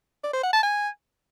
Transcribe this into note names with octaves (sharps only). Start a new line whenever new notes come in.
D5
C5
F#5
A5
G#5